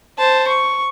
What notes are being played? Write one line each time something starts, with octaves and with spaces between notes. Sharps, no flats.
C5 A5
C#6